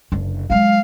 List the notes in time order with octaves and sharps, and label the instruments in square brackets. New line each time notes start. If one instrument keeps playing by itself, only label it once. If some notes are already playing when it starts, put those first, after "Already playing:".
[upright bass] F#1 D3
[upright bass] F#3 G#3 [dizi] F5